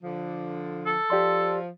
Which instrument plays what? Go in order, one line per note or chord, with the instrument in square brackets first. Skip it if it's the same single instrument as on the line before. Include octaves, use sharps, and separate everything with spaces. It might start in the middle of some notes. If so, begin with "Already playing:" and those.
[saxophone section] D3 F3
[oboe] A4
[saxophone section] F3 [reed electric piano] G4 D5 C6